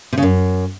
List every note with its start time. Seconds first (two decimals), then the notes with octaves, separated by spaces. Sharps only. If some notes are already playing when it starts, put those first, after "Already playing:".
0.13 C3
0.18 C#3
0.23 F#2